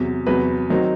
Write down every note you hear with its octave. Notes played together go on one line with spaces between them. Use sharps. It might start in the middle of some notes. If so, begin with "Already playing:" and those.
Already playing: E2 C3 F#3
E2 C3 F#3 B4
D#3 F#3 C4 D#4